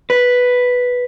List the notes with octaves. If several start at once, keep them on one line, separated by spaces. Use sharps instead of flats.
B4